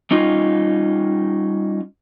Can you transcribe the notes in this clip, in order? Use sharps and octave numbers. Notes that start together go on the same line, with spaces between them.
G3 C#4 D#4 F4